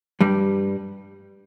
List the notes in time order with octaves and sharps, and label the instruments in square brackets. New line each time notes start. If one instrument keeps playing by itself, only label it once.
[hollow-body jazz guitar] G2 G3